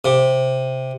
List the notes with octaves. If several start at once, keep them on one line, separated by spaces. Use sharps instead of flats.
C3